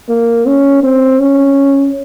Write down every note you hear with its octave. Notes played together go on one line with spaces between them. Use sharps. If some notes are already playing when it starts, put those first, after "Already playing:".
A#3
C#4
C4
C#4